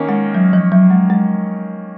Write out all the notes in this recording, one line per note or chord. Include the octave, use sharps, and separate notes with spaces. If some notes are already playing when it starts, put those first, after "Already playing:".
Already playing: D#3 A#3 C#4
G#3
F#3
F3
F#3
G#3
G#3